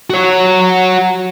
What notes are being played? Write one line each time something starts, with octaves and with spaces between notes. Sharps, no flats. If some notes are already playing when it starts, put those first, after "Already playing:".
F#4 C#5